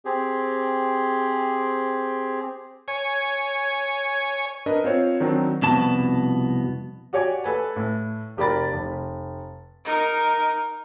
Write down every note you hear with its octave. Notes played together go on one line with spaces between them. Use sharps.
C4 G4 G#4
C#5 G#5
D4 A#4 B4 D#5
C4 F4 C5 C#5
D#3 F#3 C4 D4 D#4
C2 F2 B2 B3 A5
F#4 G4 C#5 D5 G#5
A4 B4 G#5
A2
F1 G4 A#4 D5 B5 A6
F1
D#4 A#4